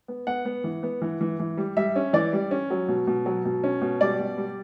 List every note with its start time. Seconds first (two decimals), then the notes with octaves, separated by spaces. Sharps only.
0.08 B3
0.27 B3 F#5
0.45 B3
0.64 E3
0.83 B3
1.02 E3
1.21 E3
1.40 E3
1.57 G3
1.77 G3 E5
1.96 C#4
2.13 E3 D5
2.33 G3
2.51 C#4
2.70 F#3
2.88 B2
3.07 B2
3.26 F#3
3.45 B2
3.64 C#4
3.81 B2
4.01 G3 D5
4.19 B2
4.38 G3